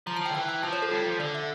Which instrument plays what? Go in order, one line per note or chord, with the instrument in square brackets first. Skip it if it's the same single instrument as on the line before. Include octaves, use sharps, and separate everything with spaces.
[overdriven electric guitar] F3 [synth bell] A#5
[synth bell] A5
[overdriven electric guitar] F3 [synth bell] G5
[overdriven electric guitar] D3
[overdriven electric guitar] E3 [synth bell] G5
[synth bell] G5
[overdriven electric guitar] F3 [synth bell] A5
[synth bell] C#5
A4
[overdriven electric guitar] G3 [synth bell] F4
[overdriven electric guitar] F3
[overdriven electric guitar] D3 [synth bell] D5
[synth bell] E5